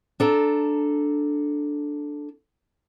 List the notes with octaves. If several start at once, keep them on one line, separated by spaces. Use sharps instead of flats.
D4 A4 A#5